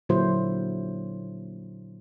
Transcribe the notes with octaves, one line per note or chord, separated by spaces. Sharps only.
A#2 D3 F#3 E4 C5